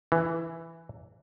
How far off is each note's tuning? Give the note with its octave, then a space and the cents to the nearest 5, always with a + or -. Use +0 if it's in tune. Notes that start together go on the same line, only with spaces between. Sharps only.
E3 +5